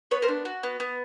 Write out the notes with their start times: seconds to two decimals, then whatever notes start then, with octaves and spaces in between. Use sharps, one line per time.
0.11 B3 B4 C#5
0.22 A#4 C5
0.28 D4
0.45 F#4
0.63 B3
0.80 B3